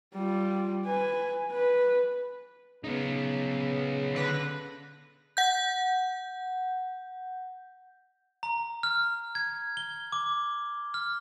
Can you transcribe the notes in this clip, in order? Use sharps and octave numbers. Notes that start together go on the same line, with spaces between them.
G3 F4
B4 G#5
B4
C#3 B3 D#4
D3 B4 A#6
F#5 G6
A#5
F6
G#6
G7
D6
F6